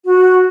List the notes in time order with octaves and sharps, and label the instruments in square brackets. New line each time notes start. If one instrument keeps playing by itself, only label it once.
[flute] F#4